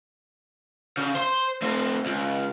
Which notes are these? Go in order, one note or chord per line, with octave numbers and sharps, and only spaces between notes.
C#3
C5 C6
A3 C4
C#2